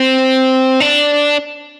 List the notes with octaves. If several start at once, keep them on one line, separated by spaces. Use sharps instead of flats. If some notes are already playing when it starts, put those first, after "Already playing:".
Already playing: C4
D4